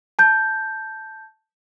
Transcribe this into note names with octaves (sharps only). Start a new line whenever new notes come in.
A5 G6